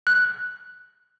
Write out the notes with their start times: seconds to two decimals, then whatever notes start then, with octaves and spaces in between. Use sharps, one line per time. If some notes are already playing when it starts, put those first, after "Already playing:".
0.07 F#6